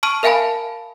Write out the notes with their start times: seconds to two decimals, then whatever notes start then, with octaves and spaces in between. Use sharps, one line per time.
0.03 A5 C#6 F6 D#7
0.23 A#4 E5 F5 G#5 A5 B5